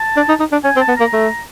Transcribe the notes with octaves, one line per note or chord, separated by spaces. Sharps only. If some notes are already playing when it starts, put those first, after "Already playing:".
Already playing: A5
D4
D#4
D#4
D4
C#4 G#5
C4
A5
B3
A#3 A#5
A3